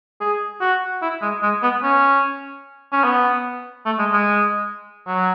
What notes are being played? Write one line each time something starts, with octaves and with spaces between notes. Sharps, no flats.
G#4
F#4
E4
G#3
G#3
B3
C#4
C#4
B3
A3
G#3
G#3
F#3